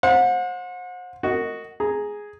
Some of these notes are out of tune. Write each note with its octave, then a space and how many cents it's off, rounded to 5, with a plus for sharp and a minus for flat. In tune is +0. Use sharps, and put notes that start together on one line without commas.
C5 +15 F#5 -35
F#4 +0 A#4 -30 D#5 +5
G#4 +0 A#5 +0